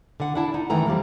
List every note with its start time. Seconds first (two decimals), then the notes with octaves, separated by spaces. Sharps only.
0.20 D3 F#5
0.35 D4 E4 A5
0.54 D#4
0.70 F#2 D#3 E3 A3 A#5
0.86 A2 F3 G3 A#3